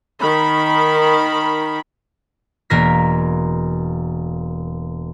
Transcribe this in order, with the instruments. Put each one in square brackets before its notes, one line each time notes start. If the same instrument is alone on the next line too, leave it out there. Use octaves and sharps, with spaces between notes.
[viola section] D#3 B5
[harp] E1 A#3 A#4 A#6 B6